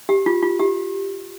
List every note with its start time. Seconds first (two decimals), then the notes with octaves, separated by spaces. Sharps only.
0.09 G4
0.26 F4
0.42 F4
0.59 G4